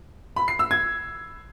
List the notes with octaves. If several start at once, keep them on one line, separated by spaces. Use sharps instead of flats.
B5
C7
E6
G#6